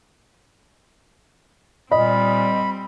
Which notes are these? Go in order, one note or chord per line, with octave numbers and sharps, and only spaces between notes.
A#2 G3 C4 D#5 B5